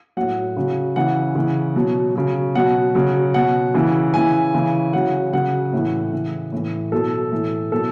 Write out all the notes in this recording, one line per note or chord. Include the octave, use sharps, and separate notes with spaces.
A2 F#3 F#5
C#3 F#3
C#3 E3 F#5
C#3 E3
B2 F#3
C#3 F#3
B2 F#3 F#5
C#3 F#3
B2 F#3 F#5
C#3 E3
C#3 E3 G#5
C#3 E3
C#3 F#3 F#5
C#3 F#3 F#5
A2 E3
C#3 E3
A2 E3
B2 F#3 A4
A2 E3
B2 F#3 A4